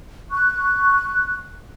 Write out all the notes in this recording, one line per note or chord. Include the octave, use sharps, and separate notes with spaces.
C#6 F#6